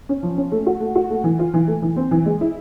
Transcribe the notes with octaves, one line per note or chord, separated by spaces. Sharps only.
C#4
F3
C#4
A3
F#4
A3
F#4
A3
E3
F4
E3
A3
E3
C4
E3
G#3
E4